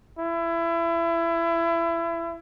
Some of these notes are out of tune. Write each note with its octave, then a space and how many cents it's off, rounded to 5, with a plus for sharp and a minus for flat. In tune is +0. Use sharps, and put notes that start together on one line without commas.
E4 +25